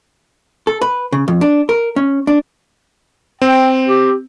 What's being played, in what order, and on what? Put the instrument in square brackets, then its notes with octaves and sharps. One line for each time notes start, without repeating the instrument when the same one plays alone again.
[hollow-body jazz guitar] A4
B4
C#3
F2
D4
A#4
C#4
D4
[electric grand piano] C4 [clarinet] G5
[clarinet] G4